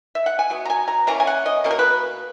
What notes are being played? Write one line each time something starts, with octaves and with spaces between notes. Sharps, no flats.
E5
F#5
G#5
F#3 B3
A#5
G#5
A#5
E3 A#3 C#4 A#5
G#5
F#5
D#5
B2 A#3 C#4
A#4
B4